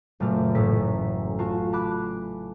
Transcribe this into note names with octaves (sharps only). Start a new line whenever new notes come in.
F#1 F#2 A#2 A3 A5 F6
A1 A2 A4 B6
F4 F#4 A5 C#6
A5 B5 D6 F#6